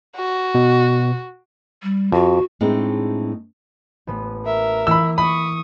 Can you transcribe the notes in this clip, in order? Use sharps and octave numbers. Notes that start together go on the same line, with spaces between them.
F#4
B2
G3
F2 F#4
A2 G#3 A3 C4 D4 D#4
A1 B3 D#7
A#4 E5
E3 A#3 B5 D6 E6
E5 B5 C#6 D#6